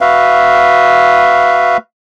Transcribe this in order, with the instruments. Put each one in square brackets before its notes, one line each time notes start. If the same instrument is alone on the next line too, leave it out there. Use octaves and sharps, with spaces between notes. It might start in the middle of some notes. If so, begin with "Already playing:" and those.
[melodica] F#4 B4 E5 F5